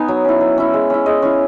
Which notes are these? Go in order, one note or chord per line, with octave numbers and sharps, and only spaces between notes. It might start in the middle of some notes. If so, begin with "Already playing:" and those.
Already playing: B3 D#4 G#5
F#3
C#4 E4
F#3
C#4 E4
G#3
C#4 E4
G#3 D#5
C#4 E4